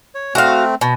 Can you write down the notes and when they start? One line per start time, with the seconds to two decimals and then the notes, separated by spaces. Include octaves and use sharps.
0.15 C#5
0.35 A3 C4 F#4 F5
0.81 B2